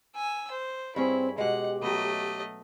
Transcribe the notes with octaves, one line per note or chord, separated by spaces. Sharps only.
G#5 E6
C5
G2 C4 C#4 E4 G#4
B2 G#3 G4 F#5
F#3 A3 B3 D#5